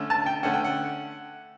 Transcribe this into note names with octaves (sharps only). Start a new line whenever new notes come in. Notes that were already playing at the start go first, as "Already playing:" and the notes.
Already playing: D3 A3 C#4
A5
G5
D3 A3 C#4 F#5
G5
F#5